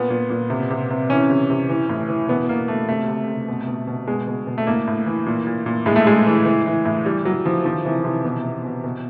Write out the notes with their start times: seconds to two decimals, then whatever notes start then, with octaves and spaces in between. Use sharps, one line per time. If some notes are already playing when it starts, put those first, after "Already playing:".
Already playing: A#2 B3
0.10 A#2
0.30 A#2
0.50 C3
0.70 C3
0.90 C3
1.10 E3 C#4
1.30 C3
1.50 C3
1.69 E3
1.89 A2
2.09 E3
2.28 B2 B3
2.49 B2 A#3
2.68 B2 A3
2.88 C3 A3
3.08 C3
3.28 C3
3.48 B2
3.68 B2
3.87 B2
4.07 B2 G#3
4.27 B2
4.47 B2
4.58 A3
4.67 A2 A#3
4.87 A2
5.06 E3
5.26 A#2
5.47 A#2
5.66 A#2
5.86 A2 G#3
5.96 A3
6.06 A2 G#3
6.26 E3
6.46 E3
6.66 E3
6.85 A2
7.05 E3 G3
7.25 E3 F#3
7.45 E3 F3
7.65 D#3 F3
7.85 C3 E3
8.04 C3 E3
8.24 B2
8.45 B2
8.65 B2
8.84 B2